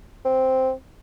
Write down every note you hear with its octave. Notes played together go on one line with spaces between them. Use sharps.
C4